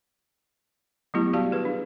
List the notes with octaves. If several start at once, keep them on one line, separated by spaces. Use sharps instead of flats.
F#3 G3 A3 B3 E4 G4
F#4 G4 D5 F5 A5
G#4 B4
D4